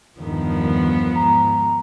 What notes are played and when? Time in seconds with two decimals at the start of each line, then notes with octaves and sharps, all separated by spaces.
0.18 E2 G2 D#3 F3 B3
1.15 G#2 A#5